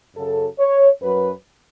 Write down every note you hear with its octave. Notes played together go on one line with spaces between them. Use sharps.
F#2 C#3 F#3 A4
C#5
F#2 F#3 B4